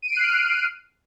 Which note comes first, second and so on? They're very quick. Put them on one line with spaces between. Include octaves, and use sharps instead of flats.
D#7 D7 C7 F#6 F6